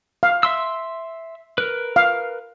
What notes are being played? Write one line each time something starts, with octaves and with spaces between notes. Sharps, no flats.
F5
E5 C6 E6
A#4 B4
F5